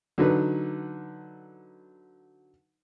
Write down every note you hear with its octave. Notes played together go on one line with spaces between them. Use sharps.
D3 F#3 D#4 B4